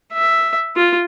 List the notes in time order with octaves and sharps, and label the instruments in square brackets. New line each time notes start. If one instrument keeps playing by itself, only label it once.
[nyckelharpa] E5
F4